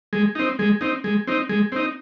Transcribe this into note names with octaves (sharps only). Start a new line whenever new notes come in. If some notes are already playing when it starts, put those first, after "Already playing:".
G#3
C4 D#4
G#3
C4 D#4
G#3
C4 D#4
G#3
C4 D#4